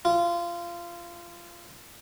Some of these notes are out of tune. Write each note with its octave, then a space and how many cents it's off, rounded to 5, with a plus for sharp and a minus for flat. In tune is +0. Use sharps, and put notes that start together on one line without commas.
F4 -20